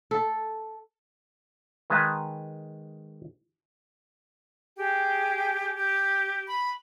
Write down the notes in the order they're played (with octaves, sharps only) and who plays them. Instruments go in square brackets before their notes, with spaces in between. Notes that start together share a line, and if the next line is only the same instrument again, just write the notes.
[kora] A4
[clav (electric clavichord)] D#3 G#3 B4 A5
[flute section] G4 G#4 G5
G4
B5